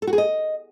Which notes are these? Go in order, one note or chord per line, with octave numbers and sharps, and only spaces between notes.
A4
F#4
G#4
D#5